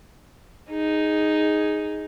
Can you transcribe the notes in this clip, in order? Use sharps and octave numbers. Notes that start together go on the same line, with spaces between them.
D#4 G#4